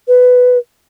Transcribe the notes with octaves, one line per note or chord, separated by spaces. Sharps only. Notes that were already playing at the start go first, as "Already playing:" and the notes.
B4